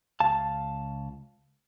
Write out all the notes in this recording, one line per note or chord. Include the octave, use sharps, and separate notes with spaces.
C#2 F5 A5